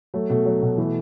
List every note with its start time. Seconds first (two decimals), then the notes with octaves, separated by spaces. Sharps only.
0.14 F#3 A3
0.29 B2 A3
0.45 F#3
0.62 B2
0.78 E3 A3